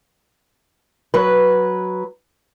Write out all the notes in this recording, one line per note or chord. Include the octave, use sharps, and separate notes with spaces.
F#3 B4